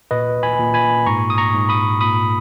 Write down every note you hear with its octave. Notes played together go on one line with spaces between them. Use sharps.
A#2 B4 D#5
G#5 B5
A#2
G#5 B5
G#2 A#5 C#6
D#6
A#5 C#6
G#2
B5 D#6
A#2 B5 D#6